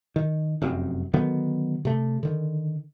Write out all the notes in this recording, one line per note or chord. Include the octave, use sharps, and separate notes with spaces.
D#3
F1 F#2 F#3 C4
D3 D#3 F#3 B3
C3 A3
D3 D#3